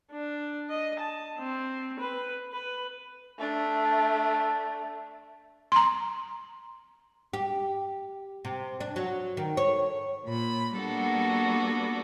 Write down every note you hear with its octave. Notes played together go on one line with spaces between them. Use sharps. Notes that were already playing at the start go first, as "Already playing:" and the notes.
D4
D#5
A5
C4
B4
B4
A3 D4
A#5 C6
G4
C3
D4
F#3
D#3
C#5
A#2 B5
G3 A#3 B3 D4 F#4 A4